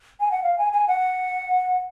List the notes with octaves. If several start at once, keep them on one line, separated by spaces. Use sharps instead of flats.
G#5
F#5
F5
G#5
G#5
F#5